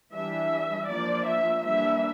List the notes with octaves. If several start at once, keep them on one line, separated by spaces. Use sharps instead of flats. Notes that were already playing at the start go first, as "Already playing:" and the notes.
E3 G3 D4 E5
F3 A#3 D4 D5
E5
E3 G3 A#3 D4 E5